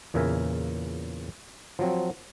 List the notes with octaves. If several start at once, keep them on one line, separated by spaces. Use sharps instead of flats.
E2 A#2 C#3 A#4 E5 G#5
F3 F#3 C4